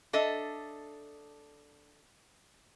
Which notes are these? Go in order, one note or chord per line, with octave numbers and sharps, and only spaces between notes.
D4 A4 D#5 E5